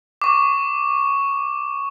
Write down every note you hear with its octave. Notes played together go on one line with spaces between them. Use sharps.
C#6 D6